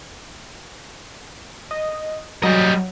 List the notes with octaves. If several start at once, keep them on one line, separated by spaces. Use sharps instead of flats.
D#5
F#3 G3 D#5